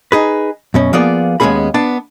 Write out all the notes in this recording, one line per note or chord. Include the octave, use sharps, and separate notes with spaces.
D#4 G#4 B4
F#2 B2 C#4
F3 A#3 B3 F4 G#4 D5
D#2 G#3 B3 C#4 G#4 B5
B3 D4 A5